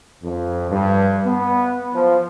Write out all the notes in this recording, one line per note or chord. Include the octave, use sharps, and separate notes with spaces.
F2
G2
B3
F3